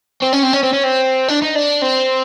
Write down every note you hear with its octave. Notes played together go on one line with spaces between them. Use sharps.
C4
C#4
C4
C#4
C4
C#4
C4
D4
D#4
D4
C4